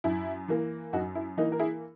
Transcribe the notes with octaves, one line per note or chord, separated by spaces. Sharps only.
F#2 E4
E3 A#3
F#2 D#4 F#4
E4
E3 A#3 D#4
A#4
E4 G#4